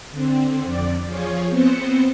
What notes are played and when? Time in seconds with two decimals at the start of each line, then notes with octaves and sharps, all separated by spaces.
0.12 D3 C4
0.64 F2 D5
1.06 F3 F4 G#4 C#5
1.50 B3 C4 C5 C#7